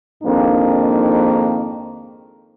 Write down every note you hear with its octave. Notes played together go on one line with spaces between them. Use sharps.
F2 G#2 D#3 A#3 C4 D4